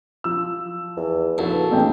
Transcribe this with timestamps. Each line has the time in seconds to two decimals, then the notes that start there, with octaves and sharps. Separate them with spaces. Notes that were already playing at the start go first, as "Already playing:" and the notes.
0.24 F3 E6
0.97 E2
1.38 A#1 E4 F#4 A4 B4
1.71 E2 A2 A#3 C#4 D#4 G5